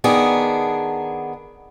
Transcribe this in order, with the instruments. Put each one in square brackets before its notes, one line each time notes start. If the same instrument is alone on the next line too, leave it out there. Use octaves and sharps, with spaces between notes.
[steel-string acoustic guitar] D#3 B3 D4 G#4